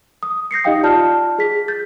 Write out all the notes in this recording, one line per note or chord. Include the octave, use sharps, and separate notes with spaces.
D#6
G6 A#6 C7 C#7
D#4 G4 D#5 F5 G5 D#6
F4 D5 A5 F6 G6
G#4 B6
G6 A6